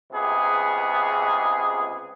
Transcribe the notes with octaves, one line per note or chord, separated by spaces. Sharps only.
C#2 C3 B3 G#4